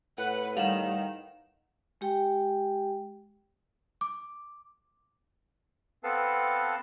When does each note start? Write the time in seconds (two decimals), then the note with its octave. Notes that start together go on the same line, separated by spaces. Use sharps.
0.18 A2 B4 F#5
0.57 D#3 G3 F5 F#5 E7
2.01 G#3 G4 G5
4.01 D6
6.04 B3 C4 A4 B4 F5 A5